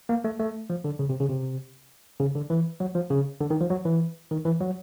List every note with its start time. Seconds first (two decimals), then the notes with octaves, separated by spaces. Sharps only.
0.09 A#3
0.24 A3
0.39 A3
0.70 F3
0.84 D3
0.99 C#3
1.09 C3
1.20 C#3
1.29 C3
2.20 C#3
2.35 D3
2.50 E3
2.80 F#3
2.95 F3
3.10 C#3
3.40 D3
3.50 D#3
3.60 F3
3.70 F#3
3.85 E3
4.31 D#3
4.45 E3
4.61 F#3